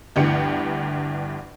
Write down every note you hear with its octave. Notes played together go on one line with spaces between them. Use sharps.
G1 D2 G2 E3 G4 C#7